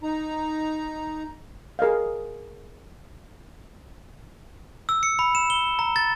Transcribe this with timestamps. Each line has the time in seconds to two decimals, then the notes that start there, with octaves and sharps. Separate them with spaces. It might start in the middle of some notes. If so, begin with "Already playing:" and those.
0.03 D#4 A#5
1.79 G#4 A#4 D#5 F5
4.89 E6
5.03 C#7
5.19 B5
5.35 E7
5.50 G7
5.79 A#5
5.96 A6